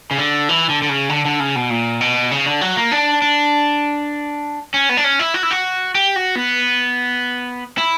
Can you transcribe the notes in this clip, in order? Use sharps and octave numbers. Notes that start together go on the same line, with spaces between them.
C#3
D3
E3
D3
D3
C#3
D3
D3
C#3
B2
A#2
B2
C#3
D3
F#3
A#3
D4
D4
C#4
B3
D4
C#4
E4
F#4
E4
F#4
G4
F#4
B3
E4